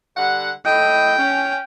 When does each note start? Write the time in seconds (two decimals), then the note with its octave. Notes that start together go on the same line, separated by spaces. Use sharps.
0.17 D3 G3 F#5
0.66 A2 D#5 G5
1.18 C#4